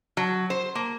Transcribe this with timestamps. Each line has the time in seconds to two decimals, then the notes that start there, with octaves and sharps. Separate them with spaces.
0.17 F#3
0.50 C5
0.75 A#3